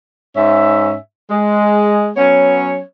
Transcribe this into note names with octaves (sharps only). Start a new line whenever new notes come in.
G#2 C#4 E5
G#3
F#3 B3 C#4 C#5